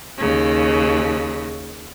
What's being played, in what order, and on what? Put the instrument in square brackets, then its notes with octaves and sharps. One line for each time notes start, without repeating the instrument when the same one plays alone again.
[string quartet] D#2 C#3